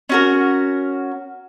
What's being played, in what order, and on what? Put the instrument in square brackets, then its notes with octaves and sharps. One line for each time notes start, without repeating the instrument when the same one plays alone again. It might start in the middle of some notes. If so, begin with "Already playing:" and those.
[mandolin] C#4 F#4 A#4